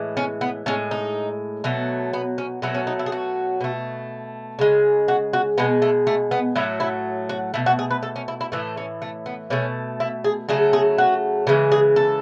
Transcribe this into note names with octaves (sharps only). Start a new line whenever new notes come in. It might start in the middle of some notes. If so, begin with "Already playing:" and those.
Already playing: A2 E3 G#3
C#4
B3
A2 G#3 C#4
D#4
B2 F#3 A3
B3
C#4
B2 F#3 A3 B3
C#4
D#4
E4
G#4
F#4
B2 A3
C#3 G#3
F#4
F#4
B2 G#3 B3
A3
A3
B3
A2 F#3 A3 E4
E4
F#4
B2 A3 E4
F#4
G#4
B4
A4
C#4
E4
E4
A2 E3 A3 E4
C#4
A3
B3
B2 A3 C#4
E4
G#4
C#3 F#3 A3 G#4
G#4
F#4
C#3 E3 G#3
G#4
A4